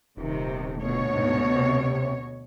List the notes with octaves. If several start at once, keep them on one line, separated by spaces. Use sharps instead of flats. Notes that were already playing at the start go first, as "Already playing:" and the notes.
D#1 C3 D#3
D2 B2 C#5
G#2
C3